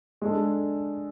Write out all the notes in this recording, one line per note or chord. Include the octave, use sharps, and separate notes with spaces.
G#3 D4 A4